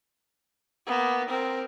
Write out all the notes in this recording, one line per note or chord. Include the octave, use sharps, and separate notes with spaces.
A#3 B3
C4 A#4